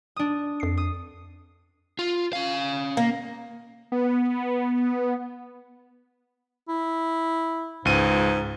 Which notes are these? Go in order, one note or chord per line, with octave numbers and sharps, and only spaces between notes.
D4 D#6
F2 C7
D#6
F4
C#4 F5
A#3
B3
E4
C#2 G#2 D#7